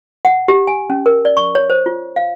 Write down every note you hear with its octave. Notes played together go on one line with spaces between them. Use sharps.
F#5
G4
G#5
C#4
A#4
D5
C#6
C#5
C5
F4
F5